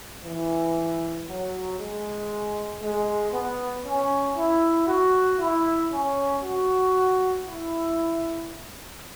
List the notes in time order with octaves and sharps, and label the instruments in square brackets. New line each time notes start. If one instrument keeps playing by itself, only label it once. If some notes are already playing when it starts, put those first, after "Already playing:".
[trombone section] E3
F#3
G#3
G#3
B3
C#4
E4
F#4
E4
C#4
F#4
E4